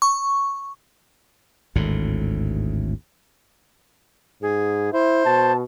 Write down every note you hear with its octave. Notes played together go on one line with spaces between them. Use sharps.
C#6
G#1 D2 A2
G#2 G#4
E4 C5
B2 A5